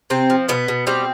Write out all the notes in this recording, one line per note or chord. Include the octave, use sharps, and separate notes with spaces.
C3 C4
F3
B2 B3
B2
G3 C4